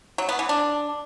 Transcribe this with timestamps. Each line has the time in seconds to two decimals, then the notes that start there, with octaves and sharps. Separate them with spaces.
0.18 F#3
0.29 B3
0.39 E3
0.49 D4